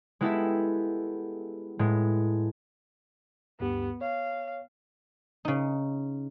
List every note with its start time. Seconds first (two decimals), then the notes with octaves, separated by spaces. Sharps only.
0.21 G#3 B3 E4 G4 A4 E5
1.79 A2 G#3 B3
3.60 D2 G2 B3 G4
4.01 C#5 F5
5.45 C#3 D#4